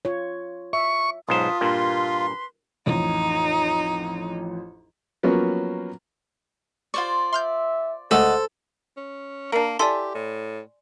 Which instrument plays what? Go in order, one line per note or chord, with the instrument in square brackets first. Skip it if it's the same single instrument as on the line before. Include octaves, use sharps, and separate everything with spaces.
[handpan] F4 C#5
[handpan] E5 [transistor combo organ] C#6
[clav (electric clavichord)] B1 G#2 C5 [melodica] F4 [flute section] B4 A5 D#6
[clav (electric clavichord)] G2 A#2 [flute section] B4 C6
[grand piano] A1 F2 [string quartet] D#4
[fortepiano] F3 F#3 A#3 B3 C#4
[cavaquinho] F4 C5 D5 [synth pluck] C#6
[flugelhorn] E5 [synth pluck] C6 F6 G6
[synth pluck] D2 G#3 A3 [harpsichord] A4 [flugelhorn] C5 [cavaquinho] D5 D#5 F#5
[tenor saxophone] C#4
[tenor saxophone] A#3 [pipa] D4 A#4
[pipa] E4 A4 E5 [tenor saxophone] G4 [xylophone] D5 G#5 C6
[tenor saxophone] A2